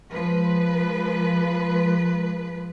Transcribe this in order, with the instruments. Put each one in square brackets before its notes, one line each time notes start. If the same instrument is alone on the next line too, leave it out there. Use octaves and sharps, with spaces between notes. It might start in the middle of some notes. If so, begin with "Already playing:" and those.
[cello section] F3 G#3 B4